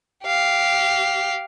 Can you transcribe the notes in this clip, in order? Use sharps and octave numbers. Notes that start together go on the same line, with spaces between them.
G4 F5